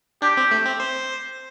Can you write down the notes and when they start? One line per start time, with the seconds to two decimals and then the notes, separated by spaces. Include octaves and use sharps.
0.22 D4 G4
0.37 C4
0.51 A3
0.66 C4
0.80 C5